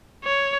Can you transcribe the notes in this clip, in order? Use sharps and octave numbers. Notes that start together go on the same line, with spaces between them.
C#5